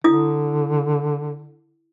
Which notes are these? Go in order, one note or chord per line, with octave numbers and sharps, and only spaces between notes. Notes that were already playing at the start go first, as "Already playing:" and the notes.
D3 E4 D#6